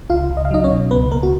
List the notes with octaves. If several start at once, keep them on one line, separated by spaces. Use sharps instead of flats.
C#2 F4 F5
C#2
D#5
F5
F#3 D#4 D#5
C#4 C#5
B2
C#2 B3 B4
C#2 A#3 A#4
F#4